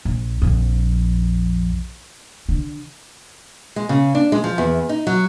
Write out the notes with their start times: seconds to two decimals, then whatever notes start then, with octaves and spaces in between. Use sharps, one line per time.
0.05 A#1
0.42 A#1 F2
2.49 D3
3.76 G#3
3.89 C#3
4.15 D4
4.32 G#3
4.44 F3
4.58 E2
4.89 D#4
5.07 F#3